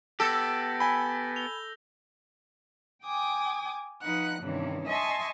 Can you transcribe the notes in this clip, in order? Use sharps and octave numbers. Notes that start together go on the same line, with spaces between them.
B3 G4 A4 E6 G6 A#6
G#5 B5 G7
F7 G7
G5 G#5 D6 D#6
F3 D#4 B4 F#5 F#6
G2 C3 D#3 E3 C#4
D#5 E5 G#5 A5 C6 C#6